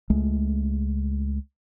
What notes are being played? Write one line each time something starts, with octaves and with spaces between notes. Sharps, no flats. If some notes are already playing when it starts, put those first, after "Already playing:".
C#2 G#3 A3